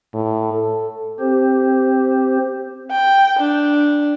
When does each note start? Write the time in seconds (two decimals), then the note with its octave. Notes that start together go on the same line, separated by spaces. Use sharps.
0.14 A2
0.54 A4
1.20 C4 G4 C5
2.91 G5
3.39 D4